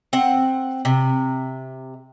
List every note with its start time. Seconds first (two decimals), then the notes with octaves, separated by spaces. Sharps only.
0.13 C4 F#5
0.85 C3